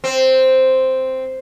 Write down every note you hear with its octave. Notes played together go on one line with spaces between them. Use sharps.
C4